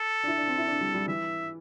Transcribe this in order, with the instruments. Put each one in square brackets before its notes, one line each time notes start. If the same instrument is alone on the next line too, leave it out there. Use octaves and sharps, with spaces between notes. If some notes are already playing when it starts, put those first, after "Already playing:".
Already playing: [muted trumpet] A4
[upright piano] D4
E4
D4
C4
E4
D4
G3
G3
[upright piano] E3 [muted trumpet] E5